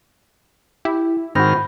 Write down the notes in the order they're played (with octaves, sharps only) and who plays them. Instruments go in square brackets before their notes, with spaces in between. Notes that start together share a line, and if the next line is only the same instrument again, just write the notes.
[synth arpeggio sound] E4 [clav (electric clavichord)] G4
[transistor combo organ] G#2 D#3 F6 [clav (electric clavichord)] C4 F#4 [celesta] B5 G6 A#6